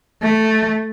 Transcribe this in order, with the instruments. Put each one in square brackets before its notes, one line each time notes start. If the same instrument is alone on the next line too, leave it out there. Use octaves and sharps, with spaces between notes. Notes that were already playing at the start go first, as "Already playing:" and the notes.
[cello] A3